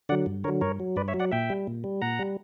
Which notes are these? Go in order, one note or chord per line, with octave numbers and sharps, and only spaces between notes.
D3 F#3 D5 F#5
G2
D3 F#3 A#4 C#5
G2 A#4 C#5
F#3
G2 B4 D5
C#5 E5
F#3
D5 F#5
A#2 E5 G5
G3
A#2
G3
A#2 F#5 A#5
G3